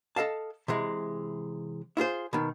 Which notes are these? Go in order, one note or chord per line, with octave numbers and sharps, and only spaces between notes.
A4 D#5 F5 A5
C3 E3 G#3
E4 F4 G#4 C5
B2 D#3